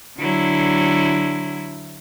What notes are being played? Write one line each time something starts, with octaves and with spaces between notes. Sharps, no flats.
D3 F#3 E4